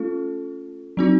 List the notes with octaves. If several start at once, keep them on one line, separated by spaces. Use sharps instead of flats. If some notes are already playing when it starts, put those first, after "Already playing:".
Already playing: A3 C#4 F4 A4
F#3 C4 D#4 F#4